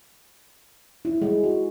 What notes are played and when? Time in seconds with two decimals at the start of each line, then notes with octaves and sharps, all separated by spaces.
1.05 E4
1.22 G#3
1.44 F#4